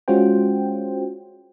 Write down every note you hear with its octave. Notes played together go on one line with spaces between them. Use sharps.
G#3 C#4 F4 F#4 C5 G5